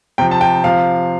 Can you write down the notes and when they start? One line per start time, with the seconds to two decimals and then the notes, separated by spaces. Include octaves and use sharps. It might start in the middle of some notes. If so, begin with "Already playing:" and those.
0.18 C3 F3 G5
0.31 A5
0.41 G5
0.64 C3 F3 F5